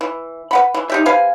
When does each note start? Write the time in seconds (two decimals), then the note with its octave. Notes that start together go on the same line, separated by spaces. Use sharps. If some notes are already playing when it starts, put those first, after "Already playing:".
0.01 E3
0.51 B4 F#5 B5
0.74 E3
0.90 D#4 G4 E5
1.05 C3 B4 F5 G#5